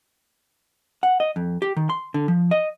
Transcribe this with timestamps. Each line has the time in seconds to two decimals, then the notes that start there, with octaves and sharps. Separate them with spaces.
1.03 F#5
1.20 D#5
1.36 F2
1.62 G4
1.77 D#3
1.90 C6
2.14 D3
2.28 F3
2.51 D#5